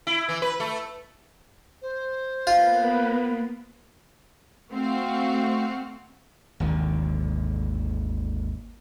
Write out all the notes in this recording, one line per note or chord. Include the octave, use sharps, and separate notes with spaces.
E4
E3
B4
A3
C5
A#3 B3 F4 B4
A3 C4 F#4 F5
G#1 D#2 D3